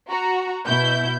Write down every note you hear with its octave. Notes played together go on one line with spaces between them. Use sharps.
F#4 A#5
B2 E4 G6